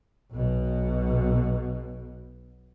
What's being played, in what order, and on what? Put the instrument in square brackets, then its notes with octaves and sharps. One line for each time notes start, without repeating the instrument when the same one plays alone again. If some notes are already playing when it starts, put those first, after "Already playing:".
[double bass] B1 B2